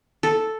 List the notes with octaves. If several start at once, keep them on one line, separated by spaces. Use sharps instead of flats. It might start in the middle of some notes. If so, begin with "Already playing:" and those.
A4